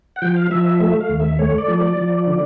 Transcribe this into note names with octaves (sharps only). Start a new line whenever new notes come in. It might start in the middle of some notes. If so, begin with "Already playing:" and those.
F#5
F3 G5
F5
F3 E5
E5
A3 E5
F5
D#2
E5
A3 C#5
D5
F3
D5
F3
D3